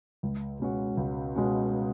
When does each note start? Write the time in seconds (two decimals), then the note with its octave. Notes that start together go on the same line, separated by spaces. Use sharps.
0.23 C#2
0.60 B2 G#3 C#4 F#4
0.97 C#2
1.35 B2 G#3 C#4 F#4